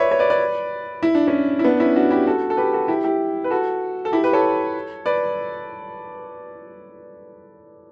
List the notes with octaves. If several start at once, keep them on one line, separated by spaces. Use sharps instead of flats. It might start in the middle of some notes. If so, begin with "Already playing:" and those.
Already playing: B4 C#5 D5 E5
C#5
B4 D5
B4 D5
E4
D4
C#4 E4
E4
B3 D4
C#4 E4
D4 F#4
E4 G4
F#4 A4
A4
G4 B4
F#4 A4
E4 G4
E4 G4
B4
F#4 A4
A4
E4 G4
G4 B4
A4 C#5
B4 D5